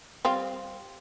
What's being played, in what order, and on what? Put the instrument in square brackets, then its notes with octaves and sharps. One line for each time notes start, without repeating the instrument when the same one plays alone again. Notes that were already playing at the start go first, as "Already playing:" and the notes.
[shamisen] G3 C4 F4